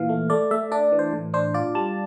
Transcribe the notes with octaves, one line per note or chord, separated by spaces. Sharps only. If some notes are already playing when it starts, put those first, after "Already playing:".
Already playing: A#2 E3 F5
A3
A3 D5
A3 E5
D4 D5
E3
C5
A2
D4 C5
F4 D5
G3 A5